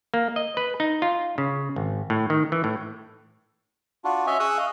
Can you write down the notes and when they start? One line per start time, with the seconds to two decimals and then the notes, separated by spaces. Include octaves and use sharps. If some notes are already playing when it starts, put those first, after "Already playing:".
0.14 A#3
0.36 D#5
0.57 B4
0.80 D#4
1.02 F4
1.38 C#3
1.76 G#1
2.10 A2
2.30 D#3
2.52 E3
2.64 A2
4.04 D4 F4 F#4
4.27 C#4 C#5 D#5 E5 G#5
4.40 G#4 C#6 D#6 E6 F#6
4.57 D#5 F5